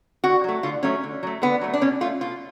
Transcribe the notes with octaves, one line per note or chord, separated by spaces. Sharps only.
D3 F#4
F#3 A3
D3 F4
F#3 A3 C#4
D3
F#3 A3
D3 B3
F#3 A3
D4
B2 C#4
A3 F4
B2 F4